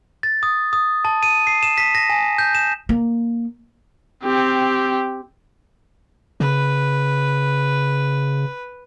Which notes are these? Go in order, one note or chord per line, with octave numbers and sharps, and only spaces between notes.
A6
D#6
D#6
A5
D#7
C7
E7
B6
A#6
G#5
G6
E7
A#3
C4 G4
C#3 B4